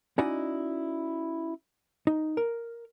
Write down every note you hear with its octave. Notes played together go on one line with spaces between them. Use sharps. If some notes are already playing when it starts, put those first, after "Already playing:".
C#4 D#4 E4 F#4 D5 D#5
D#4
A#4